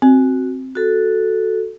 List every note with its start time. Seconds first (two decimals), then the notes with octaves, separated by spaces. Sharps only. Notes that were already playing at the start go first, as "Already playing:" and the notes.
0.02 C4 F#4
0.75 F#4 A4